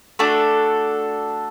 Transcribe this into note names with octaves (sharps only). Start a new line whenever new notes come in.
A3 D4 F#4 A4